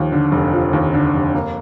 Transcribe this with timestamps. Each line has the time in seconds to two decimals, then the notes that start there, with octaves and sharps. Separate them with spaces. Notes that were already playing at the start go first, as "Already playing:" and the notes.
Already playing: D#2 F3
0.12 D3
0.32 F1
0.53 F3
0.73 D#2
0.93 D3
1.14 F1
1.34 A#3